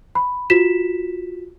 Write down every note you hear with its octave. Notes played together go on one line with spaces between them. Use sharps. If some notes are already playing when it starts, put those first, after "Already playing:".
B5
F4 F#4 B6 E7